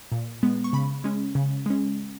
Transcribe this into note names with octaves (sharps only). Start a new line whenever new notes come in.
A#2
G#3 B3
C#6
C#3 B5
G#3 C#4
C#3
G#3 C#4